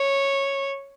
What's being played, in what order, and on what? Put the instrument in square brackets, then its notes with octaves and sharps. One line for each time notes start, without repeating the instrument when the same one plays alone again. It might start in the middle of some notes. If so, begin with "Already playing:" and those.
Already playing: [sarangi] C#5